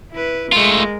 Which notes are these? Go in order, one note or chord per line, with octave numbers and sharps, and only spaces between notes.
E4 B4
G#3 A3 F4 A#4